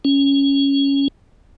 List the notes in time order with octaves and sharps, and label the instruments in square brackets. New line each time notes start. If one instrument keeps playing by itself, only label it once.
[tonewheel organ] C#4